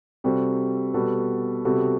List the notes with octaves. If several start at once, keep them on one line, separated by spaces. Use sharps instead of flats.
C3 G3 C4 F#4 A4
B2 G3 B3 F#4 A4
C3 G3 B3 F#4 A4